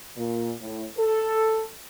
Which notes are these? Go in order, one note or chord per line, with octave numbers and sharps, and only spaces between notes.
A#2
A2
A4